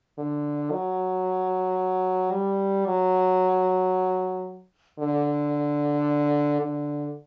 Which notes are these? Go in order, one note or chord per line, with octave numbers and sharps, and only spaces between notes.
D3
F#3
G3
F#3
D3
D3